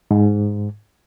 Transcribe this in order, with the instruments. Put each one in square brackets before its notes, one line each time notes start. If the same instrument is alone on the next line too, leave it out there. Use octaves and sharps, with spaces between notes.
[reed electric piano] G#2